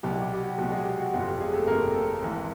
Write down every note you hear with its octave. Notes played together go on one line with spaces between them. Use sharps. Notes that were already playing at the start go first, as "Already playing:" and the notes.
C2 B2 F#3 G4
G4
G4
F#4
C2 B2 F#3 G4
G#3 G#4
G4
F#4
G1 F2 C3 G4
G4
G#3 G#4
A3 A4
G1 F2 C3 A#3 A#4
A3 A4
G#1 G#2 E3